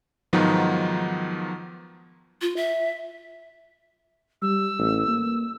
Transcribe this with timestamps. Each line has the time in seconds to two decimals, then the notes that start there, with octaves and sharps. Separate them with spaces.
0.33 G#2 D#3 F3 F#3 B3 D#4
2.42 F4
2.56 E5
4.42 G3 E6
4.78 A1
5.08 A#3